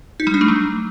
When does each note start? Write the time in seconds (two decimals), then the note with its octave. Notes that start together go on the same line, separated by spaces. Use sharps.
0.20 D#4
0.27 G3
0.34 D4
0.41 A3
0.48 F#3